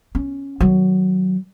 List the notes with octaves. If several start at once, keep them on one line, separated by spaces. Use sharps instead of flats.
C#4
D#3 F#3